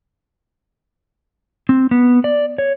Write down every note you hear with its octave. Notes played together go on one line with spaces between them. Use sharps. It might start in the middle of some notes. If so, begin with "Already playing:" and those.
C4
B3
D5
C#5